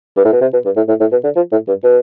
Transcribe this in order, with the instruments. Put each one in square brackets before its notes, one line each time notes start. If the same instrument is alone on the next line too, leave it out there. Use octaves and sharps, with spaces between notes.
[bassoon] G2
A2
B2
C3
B2
G2
A2
A2
A2
B2
D3
F3
A2
G2
B2